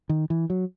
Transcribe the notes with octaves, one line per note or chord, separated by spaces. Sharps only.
D#3
E3
F#3